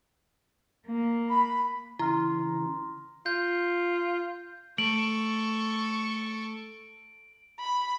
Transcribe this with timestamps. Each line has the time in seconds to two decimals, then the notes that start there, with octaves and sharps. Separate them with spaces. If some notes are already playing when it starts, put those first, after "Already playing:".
0.86 A#3
1.29 B5
1.99 C#3 E3 E4 A#5 C6 F6
3.26 F4 G6
4.78 A3 A4 C#6 D7 F#7
7.60 B5